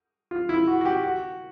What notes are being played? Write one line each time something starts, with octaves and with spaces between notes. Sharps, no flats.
F4
E4
F#4
F#4
G4
F#4